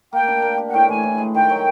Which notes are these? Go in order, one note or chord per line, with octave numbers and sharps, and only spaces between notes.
A#3 G5
D4
A#3
G4
F#5
A2 G5
E3 G#5
A2
G#3
D#3 G5
F#3